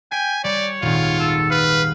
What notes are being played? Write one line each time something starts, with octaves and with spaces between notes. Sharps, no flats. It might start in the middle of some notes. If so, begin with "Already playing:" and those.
G5 G#5 B6
G3 C#5 D5
D#1 G#1 F4
A4
B4 F5